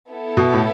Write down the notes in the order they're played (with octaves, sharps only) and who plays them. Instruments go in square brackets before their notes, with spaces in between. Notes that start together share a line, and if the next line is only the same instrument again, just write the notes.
[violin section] B3 E4 A4
[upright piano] B2
A2